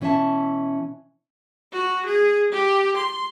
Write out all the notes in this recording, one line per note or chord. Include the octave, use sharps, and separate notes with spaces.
B2 E3 C#4 B4 E5 A5
F#4
G#4
G4
C6